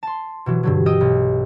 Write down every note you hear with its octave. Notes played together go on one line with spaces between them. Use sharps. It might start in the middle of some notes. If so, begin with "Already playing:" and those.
A5 C6
B2 E3 F#3
G2 D3 F#3
D#5 G5 D#6 E6
B1